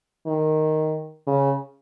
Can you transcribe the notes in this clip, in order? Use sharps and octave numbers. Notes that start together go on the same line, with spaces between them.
D#3
C#3